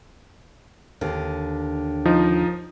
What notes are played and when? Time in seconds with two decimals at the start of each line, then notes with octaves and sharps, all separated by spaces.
1.01 D#2 D3
2.05 F3 D#4